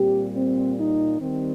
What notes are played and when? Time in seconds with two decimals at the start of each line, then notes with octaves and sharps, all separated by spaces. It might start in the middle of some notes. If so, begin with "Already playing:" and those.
Already playing: A#2 G3 C4 G4
0.36 C4
0.78 D#4
1.21 D#3 G3 C4